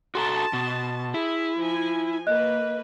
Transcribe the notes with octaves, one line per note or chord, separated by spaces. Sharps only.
F#4 A4 A5 A#5 C6
B2
E4 G#4
F3 G#5
A#3 B4 D#5 F#6